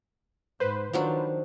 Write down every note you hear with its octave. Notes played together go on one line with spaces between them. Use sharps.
G#2 B4 C5
D#3 F3 F#3 D4